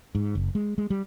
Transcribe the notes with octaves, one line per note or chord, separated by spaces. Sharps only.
G#2
F#1
G#3
G#3
G3